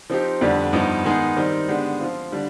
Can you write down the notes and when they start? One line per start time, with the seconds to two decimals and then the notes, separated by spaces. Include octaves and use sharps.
0.10 F3 C4 D#4 G4
0.41 F2 D3 G3 B3 D4
0.73 G2 F3 B3 D#4
1.05 D#3 G#3 B3 D#4 G#4
1.36 D#3 G3 C4 D#4
1.68 D3 G#3 B3 D4 G4
2.00 F3 C4 F4
2.32 D3 G3 D4